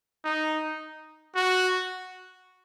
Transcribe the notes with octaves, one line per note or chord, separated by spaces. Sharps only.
D#4
F#4